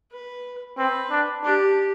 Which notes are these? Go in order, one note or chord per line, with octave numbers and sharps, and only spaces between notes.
B4
C4 B4
D4
D4 G4